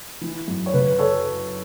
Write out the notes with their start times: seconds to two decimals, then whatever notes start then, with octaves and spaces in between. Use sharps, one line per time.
0.21 E3
0.48 F#2
0.66 C#5
0.73 C#3 B4
0.98 A4 C#5